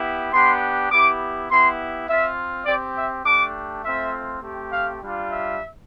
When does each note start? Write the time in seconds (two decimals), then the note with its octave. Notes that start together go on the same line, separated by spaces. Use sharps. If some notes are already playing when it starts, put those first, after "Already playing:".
Already playing: B3 E4 G4
0.32 B3 D4 G4 C6
0.90 B3 E4 G4 D6
1.49 B3 E4 G4 C6
2.08 C4 F4 E5
2.66 C4 G4 D5
2.96 E5
3.24 A3 D4 G4 D6
3.83 A3 C4 F4 E5
4.41 A3 C4 G4
4.71 F5
5.00 G3 D4 F4
5.30 E5